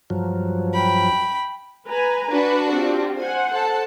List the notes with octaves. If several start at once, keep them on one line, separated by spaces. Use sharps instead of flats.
G2 F3 F#3
G5 B5
B4 G#5 A#5
D4 F#4 B4
C4 F4 G4
C5 F#5 G#5
A4 A5